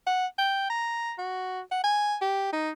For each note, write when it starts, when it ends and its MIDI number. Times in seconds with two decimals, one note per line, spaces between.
0.07 0.26 78
0.38 0.66 79
0.70 1.13 82
1.18 1.60 66
1.71 1.79 78
1.84 2.16 80
2.21 2.52 67
2.53 2.71 63